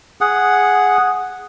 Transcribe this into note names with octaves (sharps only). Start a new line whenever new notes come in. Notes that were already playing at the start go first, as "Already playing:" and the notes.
G#4 F#5